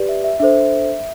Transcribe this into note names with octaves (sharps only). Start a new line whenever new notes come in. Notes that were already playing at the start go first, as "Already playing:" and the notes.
Already playing: G4 B4 D5
E5
E5
D4 A4 C5 E5